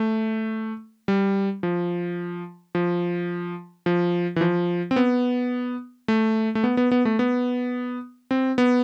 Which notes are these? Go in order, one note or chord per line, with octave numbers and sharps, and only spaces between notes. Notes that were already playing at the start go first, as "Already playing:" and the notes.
Already playing: A3
G3
F3
F3
F3
E3
F3
C4
B3
A3
A3
B3
B3
B3
A3
B3
C4
B3